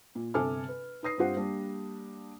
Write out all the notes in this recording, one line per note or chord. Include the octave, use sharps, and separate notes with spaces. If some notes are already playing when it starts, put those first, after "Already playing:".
A#2
G1 C3 A4 G#5 D6 F6
B4
D#4 B4 D#6 A#6 C7
G2 C4 F4 G4 F#5
G3 A#3 D4